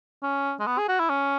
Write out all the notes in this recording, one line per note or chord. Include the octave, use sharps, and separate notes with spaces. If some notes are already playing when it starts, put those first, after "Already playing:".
C#4
G#3
B3
G#4
F#4
E4
C#4